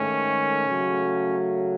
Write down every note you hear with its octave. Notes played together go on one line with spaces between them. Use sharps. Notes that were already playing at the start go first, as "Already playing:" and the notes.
Already playing: G#2 D#3 A3 C#4
C#3 F#3 A3